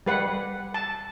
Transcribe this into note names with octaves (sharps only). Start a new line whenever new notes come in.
G3 B4 F#5
A5